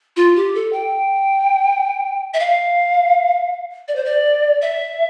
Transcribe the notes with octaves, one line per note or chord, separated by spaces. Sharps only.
F4
G4
A4
G5
E5
F5
D5
C5
D5
E5